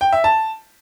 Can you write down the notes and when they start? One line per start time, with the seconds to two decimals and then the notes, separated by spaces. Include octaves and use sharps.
0.01 G5
0.13 E5
0.24 A5